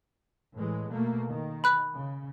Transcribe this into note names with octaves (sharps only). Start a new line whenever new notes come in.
A2 E3 G#3
B2 A3 A#3
D#3
B5 F#6
C#3